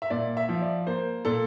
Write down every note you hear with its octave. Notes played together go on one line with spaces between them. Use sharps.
E5
A#2 D5
E5
F3
D5
A#3 C5
A#2 A4